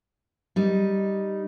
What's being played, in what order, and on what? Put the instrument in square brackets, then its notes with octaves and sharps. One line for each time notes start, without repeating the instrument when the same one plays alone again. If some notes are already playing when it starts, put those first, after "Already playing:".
[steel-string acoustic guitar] G3 D#4